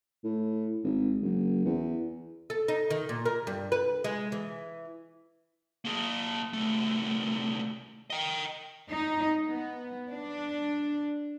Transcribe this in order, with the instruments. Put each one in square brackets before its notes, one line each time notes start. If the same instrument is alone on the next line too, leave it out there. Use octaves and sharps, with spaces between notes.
[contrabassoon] A2
G#1
F#1
E2
[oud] A4
D#4
D#3
A#2
A#4
G2
B4
G#3
E3
[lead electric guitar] A#3 G#4
C2 A3
D#5 G5
[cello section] D#4
B3
D4